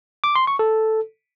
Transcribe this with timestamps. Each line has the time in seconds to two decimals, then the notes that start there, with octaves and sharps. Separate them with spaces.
0.24 D6
0.36 C6
0.47 C#6
0.59 A4